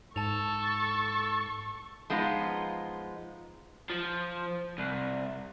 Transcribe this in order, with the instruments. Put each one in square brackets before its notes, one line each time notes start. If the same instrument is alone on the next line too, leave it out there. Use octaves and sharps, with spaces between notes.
[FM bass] G#2 [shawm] A4 [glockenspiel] A5 F7 [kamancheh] C#6
[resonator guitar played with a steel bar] F3 G#3 B3 D#4 F4
[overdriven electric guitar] F3
C2